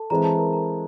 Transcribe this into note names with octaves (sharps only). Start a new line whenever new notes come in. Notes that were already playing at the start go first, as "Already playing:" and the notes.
Already playing: A4 A5
E3 G#3 C4 E4 A#5
A5
A#4 A#5
A#4 A#5